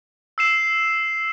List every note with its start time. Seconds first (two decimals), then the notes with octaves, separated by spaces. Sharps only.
0.38 E6 C7 E7